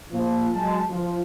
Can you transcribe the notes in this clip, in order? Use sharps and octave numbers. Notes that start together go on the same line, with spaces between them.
A#2 F3
F#3 G#3 A5
F3